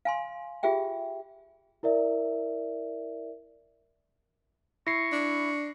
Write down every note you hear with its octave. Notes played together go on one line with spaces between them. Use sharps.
F5 G#5 C6
F4 G4 G#4 E5 G5
E4 A#4 D5 E5
E4 C#6 A#6 C7
D4